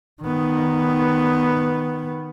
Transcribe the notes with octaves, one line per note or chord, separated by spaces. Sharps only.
D#3 B3